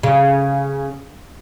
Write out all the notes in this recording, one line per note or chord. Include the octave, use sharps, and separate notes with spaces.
C#3